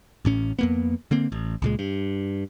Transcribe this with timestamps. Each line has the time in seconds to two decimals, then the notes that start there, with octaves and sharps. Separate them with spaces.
0.25 A1 A2 C#4
0.59 F2 A#3 B3
1.11 D3 A#3 C4
1.32 A1
1.62 C#2 A#2 G#3
1.79 G2